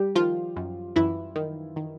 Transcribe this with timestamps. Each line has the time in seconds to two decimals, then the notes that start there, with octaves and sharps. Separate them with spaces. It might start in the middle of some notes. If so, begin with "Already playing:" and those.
Already playing: G3 G4
0.15 D#3 F3 F4
0.56 F#2
0.96 F#2 E3 E4
1.35 D#3
1.76 D#3